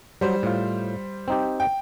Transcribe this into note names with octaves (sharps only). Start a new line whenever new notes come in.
F#3 G3 C5
A2 F4
C4 D#4 G4
G5